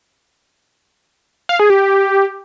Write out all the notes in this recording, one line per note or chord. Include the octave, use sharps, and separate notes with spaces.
F5
G#4
G4